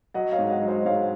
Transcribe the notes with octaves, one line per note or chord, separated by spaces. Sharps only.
F#3 D#5 F#5
C#5 F5
G#2
D#5 F#5
F#3
C5 D#5
G#2 C#5 F5